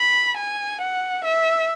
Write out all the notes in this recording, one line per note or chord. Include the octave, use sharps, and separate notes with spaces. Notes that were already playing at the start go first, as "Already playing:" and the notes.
Already playing: B5
G#5
F#5
E5